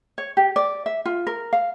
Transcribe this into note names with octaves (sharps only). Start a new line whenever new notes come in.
C#5
G4
D5
E5
F4
A#4
F5